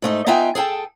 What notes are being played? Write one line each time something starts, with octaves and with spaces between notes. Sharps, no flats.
G#2 A3 D#4
B3 D#4 F4 E5 G5 G#5
G#4 A4 G5 A5